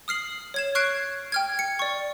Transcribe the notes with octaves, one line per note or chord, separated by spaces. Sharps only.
D#6 F6 C7 F#7
C#5 G#6 E7
C#6 F6 F#6 G#6 C7 D7
G5 F6 G#6
C#7
D5 C#6